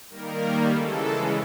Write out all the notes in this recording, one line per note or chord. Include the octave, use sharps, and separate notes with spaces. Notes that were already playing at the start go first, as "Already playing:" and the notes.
D#3 G3 A#3 A#4
C#3 E3 G#3 A4